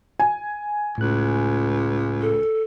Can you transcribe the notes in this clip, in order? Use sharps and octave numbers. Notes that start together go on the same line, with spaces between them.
G#5
C#2 A2 F#6
A4